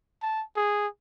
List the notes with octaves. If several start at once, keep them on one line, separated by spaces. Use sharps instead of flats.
A5
G#4